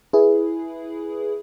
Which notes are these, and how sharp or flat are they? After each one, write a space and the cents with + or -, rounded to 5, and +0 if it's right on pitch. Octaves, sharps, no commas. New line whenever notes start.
E4 +0 G#4 +5 B4 +0